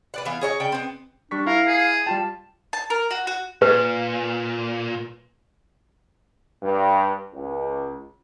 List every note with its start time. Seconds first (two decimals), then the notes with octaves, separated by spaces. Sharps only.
0.14 B4 D5 F#5
0.25 E3 B3 F5
0.41 G#4 C#5 D#5 A#5
0.60 C#3 D5 G5
0.72 B3 C4
1.31 G3 D4 C#6 B6
1.47 E4 A#4 F5
1.67 G#4
2.06 G3 F4 G5 A5
2.73 A5
2.90 A#4
3.11 F#4
3.27 F#4
3.62 A#2 B4
6.62 G2
7.34 C#2